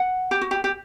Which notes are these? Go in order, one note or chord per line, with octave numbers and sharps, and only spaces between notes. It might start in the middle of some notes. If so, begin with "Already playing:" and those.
Already playing: F#5
G4
F#4
G4
G4